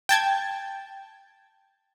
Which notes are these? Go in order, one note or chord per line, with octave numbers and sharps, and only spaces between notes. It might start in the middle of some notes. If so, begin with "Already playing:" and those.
G5 A5 G#6